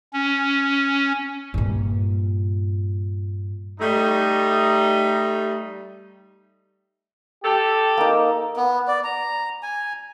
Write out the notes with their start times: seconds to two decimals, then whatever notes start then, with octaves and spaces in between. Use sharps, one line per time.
0.13 C#4
1.54 G2 A#2
3.80 G3 A3 D#4
7.43 G4 A4
7.97 A#3 D#4
8.56 B3
8.87 D5
9.04 A#5
9.63 G#5